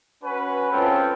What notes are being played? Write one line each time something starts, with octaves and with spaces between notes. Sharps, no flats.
C#4 F#4 B4
G#3 C4 C#4 F4 A4